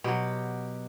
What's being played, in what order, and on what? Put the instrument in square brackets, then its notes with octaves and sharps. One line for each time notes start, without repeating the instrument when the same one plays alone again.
[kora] B2 F#3 G4